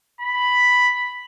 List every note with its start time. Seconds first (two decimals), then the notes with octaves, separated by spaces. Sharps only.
0.21 B5